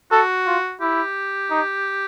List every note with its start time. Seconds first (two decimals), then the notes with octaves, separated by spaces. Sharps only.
0.11 F#4 A4
0.46 F4
0.81 E4 G4
1.50 D#4